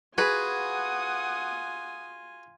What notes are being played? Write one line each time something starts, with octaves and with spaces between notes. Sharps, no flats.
F4 F#4 G#4 B4 F#5 G#5 D#6